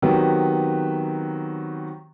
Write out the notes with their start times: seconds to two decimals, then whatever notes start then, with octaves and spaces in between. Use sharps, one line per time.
0.02 D#3 F#3 B3 C4 G4 B4